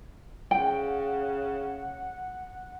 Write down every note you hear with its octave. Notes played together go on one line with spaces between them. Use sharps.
C#3 F#5 G5